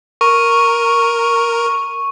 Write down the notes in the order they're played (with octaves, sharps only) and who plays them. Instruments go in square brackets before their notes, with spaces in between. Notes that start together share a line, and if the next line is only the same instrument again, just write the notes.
[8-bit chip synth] A#4 [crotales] C#6